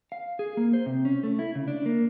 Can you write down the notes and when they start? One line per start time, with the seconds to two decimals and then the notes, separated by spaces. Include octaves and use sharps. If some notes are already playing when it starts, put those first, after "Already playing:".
0.12 F5
0.39 G#4
0.57 A#3
0.73 C5
0.86 C3
1.05 C#4
1.23 A3
1.39 E4
1.55 C#3
1.68 D4
1.86 A#3